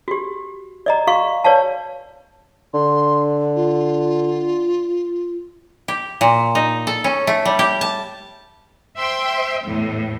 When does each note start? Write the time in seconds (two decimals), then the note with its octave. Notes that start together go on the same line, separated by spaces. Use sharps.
0.08 F#4 G4
0.86 D5 D#5 A#5
1.07 F#4 F5 C#6
1.44 B4 C#5 D5 F5 A5
2.74 D3 C6
3.55 F4
5.88 G4
6.21 A#2
6.55 D#4
6.87 A4
7.04 C#4
7.27 A3
7.45 G3
7.59 G4
7.81 A5
8.97 C5 E5 G5 C6
9.64 E2 A2